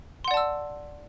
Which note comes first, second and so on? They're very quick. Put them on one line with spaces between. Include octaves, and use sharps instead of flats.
C6 F#5 D5 A5 E6